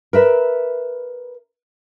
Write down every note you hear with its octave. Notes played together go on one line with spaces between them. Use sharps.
A#4 B4 E5